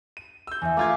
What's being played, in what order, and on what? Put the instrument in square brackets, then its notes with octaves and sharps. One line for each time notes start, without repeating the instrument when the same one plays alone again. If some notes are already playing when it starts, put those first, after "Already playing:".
[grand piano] D#7
E6 G6
[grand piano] E2 [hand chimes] E5 G#5
[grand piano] A3 F4 G#6 [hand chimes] F5 A#5 D6